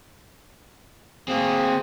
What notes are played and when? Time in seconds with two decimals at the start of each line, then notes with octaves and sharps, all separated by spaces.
1.28 A#3 C4 G#4